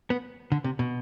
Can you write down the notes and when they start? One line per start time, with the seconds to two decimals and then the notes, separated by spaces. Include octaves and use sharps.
0.10 B3
0.52 D3
0.64 C3
0.79 B2